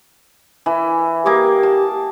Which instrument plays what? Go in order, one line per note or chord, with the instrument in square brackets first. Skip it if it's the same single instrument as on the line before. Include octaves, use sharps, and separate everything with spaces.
[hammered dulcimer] E3
[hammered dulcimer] A#3 G#4 D6 [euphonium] G4
[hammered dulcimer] A5